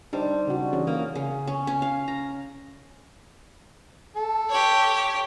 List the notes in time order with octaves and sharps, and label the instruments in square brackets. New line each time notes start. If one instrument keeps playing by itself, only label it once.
[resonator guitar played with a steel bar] G3 [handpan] D4 D#4 C5
[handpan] C#3 F#4
E3 C#4 G#4
[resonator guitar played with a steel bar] A#3
[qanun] C#3
C#4
C#4
F5
A#5
[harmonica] A4
[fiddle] G4 C#5